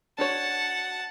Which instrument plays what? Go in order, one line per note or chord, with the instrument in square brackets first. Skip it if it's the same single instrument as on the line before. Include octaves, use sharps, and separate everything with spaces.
[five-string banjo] D4 F#4 C#5 [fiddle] F#5 A5